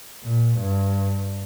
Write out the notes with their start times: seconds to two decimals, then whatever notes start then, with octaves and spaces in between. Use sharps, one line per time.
0.24 A#2
0.60 G2